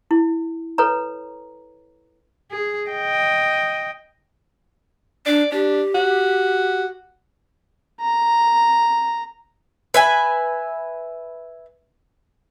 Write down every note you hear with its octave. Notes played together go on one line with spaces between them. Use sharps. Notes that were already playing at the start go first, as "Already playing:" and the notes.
E4
A4 B4 C#5 A#5
G#4
D#5 G5
D4 D5
D4 G4
F#4
A#5
B4 E5 G#5